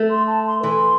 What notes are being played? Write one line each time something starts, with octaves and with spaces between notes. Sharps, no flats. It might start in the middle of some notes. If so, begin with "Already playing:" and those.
Already playing: A3
C6
A5
C6
E3 C6